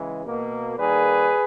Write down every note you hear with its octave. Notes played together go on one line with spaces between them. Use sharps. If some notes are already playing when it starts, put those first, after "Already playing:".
Already playing: C#3 E3 G#3
B2 A#3
D#3 G3 A#3 G#4 B4